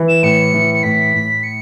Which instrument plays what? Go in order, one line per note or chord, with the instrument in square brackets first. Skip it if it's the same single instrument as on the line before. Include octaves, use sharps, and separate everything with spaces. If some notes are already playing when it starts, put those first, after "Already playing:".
Already playing: [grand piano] E3
[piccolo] E7
[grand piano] A2 [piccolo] C#7
[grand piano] E3
[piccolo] C#7
[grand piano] A2 [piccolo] B6
[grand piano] A2
[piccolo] C#7